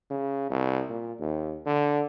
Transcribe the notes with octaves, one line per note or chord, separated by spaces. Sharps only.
C#3
C2
A#2
D#2
D3